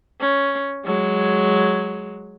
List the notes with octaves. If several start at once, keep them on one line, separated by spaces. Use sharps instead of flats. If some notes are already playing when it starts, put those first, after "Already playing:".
C#4
F#3 G#3